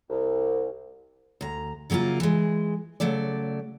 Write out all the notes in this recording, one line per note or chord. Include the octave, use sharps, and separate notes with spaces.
C2
D2 A#5
C#3 F#3 A#3 E4 F4
E3 G#3
C#3 F#3 A3 D5